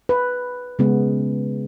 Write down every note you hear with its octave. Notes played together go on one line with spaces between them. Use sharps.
B4
C#3 G#3 B3